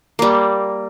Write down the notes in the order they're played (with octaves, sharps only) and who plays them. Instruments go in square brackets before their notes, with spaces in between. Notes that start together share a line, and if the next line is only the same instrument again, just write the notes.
[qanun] G3 A#3